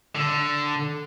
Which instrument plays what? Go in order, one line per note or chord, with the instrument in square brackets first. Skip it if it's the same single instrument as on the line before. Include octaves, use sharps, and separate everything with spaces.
[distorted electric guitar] D3